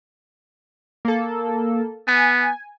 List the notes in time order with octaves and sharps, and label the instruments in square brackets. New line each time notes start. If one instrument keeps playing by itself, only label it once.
[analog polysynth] A#3 A4
[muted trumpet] B3 [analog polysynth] G#5